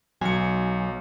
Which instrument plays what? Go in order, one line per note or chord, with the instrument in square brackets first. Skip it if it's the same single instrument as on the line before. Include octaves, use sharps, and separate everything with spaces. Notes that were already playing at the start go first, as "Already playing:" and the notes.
[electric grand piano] B1 C#7 [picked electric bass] F#3 [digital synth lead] G#5